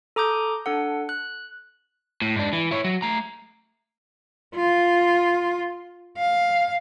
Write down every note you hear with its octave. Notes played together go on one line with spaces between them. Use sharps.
A4 A#5 D6 D#6 G6
D4 A4 F#5
F#6
A2
G#2 D4
E3
E4 C#5
F#3
A3 A#5
F4
F5